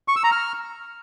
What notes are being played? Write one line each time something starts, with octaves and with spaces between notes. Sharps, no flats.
C#6
E6
A#5
F6